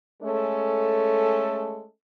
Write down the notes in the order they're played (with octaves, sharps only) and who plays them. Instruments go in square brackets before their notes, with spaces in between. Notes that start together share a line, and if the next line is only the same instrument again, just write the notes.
[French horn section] G#3 A3 C#4 A4